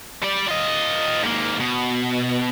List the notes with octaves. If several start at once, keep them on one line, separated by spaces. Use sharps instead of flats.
G3 D5
F4 D#5
G#2 A#3
B2